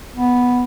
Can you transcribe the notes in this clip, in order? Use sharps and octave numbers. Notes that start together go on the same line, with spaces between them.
B3